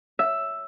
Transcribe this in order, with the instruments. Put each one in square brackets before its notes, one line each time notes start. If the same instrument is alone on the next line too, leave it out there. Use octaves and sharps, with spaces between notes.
[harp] E5